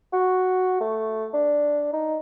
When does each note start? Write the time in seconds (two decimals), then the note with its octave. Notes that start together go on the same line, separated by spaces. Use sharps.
0.13 F#4
0.81 A3
1.33 D4
1.93 D#4